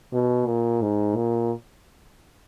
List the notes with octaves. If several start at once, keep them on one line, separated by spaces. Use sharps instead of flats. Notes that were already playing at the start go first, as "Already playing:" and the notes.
B2
A#2
G#2
A#2